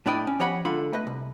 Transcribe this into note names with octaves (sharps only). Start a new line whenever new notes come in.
A2 D4 E4 D5 D#5 G5
C#4
F3 G4 C#5 D#5 F#5 B5
D3 G#3 F4 F#5 B5 C6
A3 B4 D#5
C2